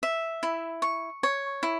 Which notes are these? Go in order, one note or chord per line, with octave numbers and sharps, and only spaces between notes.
E5
E4
C#6
C#5
E4